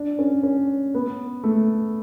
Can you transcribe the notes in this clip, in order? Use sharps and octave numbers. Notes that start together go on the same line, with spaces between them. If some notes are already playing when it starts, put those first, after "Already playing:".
Already playing: D4
C#4
C#4
B3
A3